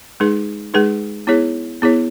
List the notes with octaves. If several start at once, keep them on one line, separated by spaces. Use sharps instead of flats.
G#3 D#4 G#4 B4
G#3 D#4 G#4 B4
B3 E4 G#4 C#5
B3 E4 G#4 C#5